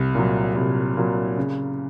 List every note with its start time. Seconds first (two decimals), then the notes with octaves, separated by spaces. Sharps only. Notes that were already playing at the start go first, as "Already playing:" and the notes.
Already playing: C2
0.15 A#2 F#3
0.56 C2
0.97 A#2 F#3
1.37 C#3